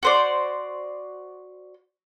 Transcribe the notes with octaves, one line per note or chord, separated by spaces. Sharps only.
F#4 C5 D5